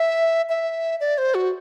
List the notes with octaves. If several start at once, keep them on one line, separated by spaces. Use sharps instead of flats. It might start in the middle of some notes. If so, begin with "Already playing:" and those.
Already playing: E5
E5
D5
C5
F#4